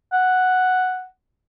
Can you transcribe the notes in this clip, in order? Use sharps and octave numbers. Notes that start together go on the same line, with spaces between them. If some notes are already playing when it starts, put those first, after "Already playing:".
F#5